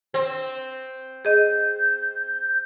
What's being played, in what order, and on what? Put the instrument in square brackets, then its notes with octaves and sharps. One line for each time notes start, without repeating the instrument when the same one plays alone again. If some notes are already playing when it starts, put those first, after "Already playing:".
[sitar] C4
[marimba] G#4 D#5 [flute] G6